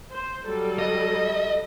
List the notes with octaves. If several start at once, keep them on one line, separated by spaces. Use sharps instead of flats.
C5
F#3 G3 A4
D#5